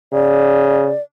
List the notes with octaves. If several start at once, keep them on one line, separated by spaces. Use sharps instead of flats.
C#3 D5